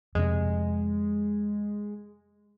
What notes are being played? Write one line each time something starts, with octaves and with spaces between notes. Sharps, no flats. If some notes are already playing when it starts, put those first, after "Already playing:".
F2 C3 G#3